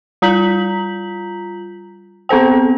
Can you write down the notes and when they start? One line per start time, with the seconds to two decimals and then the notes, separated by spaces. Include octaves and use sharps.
0.22 G3 F4 A#5 G6 B6 F#7
2.29 B3 C4 A4 C5 G5